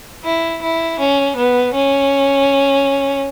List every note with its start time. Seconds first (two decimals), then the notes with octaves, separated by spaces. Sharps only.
0.25 E4
0.63 E4
0.99 C#4
1.37 B3
1.74 C#4